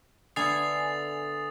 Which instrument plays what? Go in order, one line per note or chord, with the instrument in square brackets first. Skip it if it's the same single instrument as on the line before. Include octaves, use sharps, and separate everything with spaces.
[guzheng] D3 A3 B3 [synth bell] G#5 C7 [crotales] D#6 A6 F7